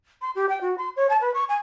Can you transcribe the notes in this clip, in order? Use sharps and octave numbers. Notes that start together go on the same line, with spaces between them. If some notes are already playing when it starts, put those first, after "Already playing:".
C6
G4
G5
F#4
C6
C#5
A5
B4
C#6
G#5